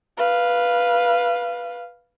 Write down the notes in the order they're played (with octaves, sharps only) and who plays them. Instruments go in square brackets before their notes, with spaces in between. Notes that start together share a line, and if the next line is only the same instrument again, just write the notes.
[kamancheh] B4 F5